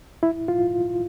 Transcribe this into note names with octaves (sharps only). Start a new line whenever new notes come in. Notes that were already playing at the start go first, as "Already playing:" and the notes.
E4
F4